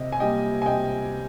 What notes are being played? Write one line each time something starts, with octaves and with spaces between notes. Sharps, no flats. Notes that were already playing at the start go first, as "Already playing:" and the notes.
Already playing: C3 D#5
G#5
G3 A#3 D#5 G5
G#5
C3 D#5 G5